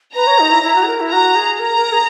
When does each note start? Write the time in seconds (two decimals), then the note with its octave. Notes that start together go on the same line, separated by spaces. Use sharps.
0.15 B4 A#5
0.27 C#5
0.39 D#4
0.51 E4
0.63 E4
0.76 F#4
0.83 G#4
0.87 A#4
1.00 E4
1.11 F#4 A#5
1.36 G#4
1.60 A#4 A#5
1.77 A#4
1.92 G#4